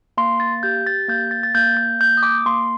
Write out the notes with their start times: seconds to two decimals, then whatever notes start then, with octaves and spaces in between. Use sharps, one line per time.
0.17 A#3 C6
0.40 A6
0.63 G4 G6
0.87 A6
1.08 A#3 G6
1.31 A6
1.43 A6
1.55 A#3 G6
1.77 G6
2.01 A#3 G6
2.17 D#6
2.23 D6
2.46 A#3 C6